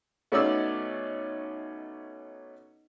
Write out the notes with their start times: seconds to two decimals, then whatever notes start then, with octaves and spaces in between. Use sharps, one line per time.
0.32 B2 A3 C#4 D#4 D5 E6